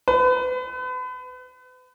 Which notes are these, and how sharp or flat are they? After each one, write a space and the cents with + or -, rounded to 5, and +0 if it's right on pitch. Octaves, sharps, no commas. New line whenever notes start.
B4 +35